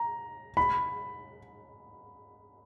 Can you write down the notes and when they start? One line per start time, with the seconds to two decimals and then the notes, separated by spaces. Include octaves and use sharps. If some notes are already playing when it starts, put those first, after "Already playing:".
Already playing: A#5
0.57 B5